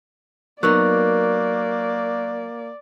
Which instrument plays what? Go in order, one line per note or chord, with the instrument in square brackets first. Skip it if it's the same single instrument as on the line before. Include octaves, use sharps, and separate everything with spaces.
[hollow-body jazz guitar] F#3 B3 D#4 [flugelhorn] A#3 [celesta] A#4 C#6 F#6 [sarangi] D5